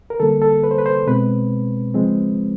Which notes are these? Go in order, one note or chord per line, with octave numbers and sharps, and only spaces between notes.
A#4
D3 G3 A#3 A4
A4
B4
C5
B4
C5
B2 G#3 C4 B4
C#3 F3 G#3 C4